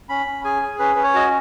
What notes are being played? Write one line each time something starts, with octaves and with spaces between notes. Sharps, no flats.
C#4 B5
C#4
G#4 G#5
G#4
C#4 B4
C#4 B4
C#5
F#4 D#5